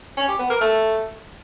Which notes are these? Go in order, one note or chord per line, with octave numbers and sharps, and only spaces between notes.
C#4
G4
B3
A#4
A3